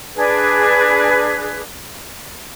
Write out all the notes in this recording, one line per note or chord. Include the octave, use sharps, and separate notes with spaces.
D4 G#4 B4